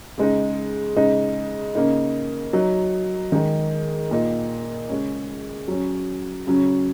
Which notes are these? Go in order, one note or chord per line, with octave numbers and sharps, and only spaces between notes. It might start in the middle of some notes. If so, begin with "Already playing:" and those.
C#3 G#3 D#4
C#3 G#3 D#4
C#3 A#3 D#4
F#3 D#4
D#3 G#3 D#4
A#2 A#3 D#4
C#3 G#3 C#4
F#3 C#4
C#3 F#3 C#4